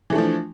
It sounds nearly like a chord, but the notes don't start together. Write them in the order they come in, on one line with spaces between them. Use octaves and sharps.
E3 A3 D4 F3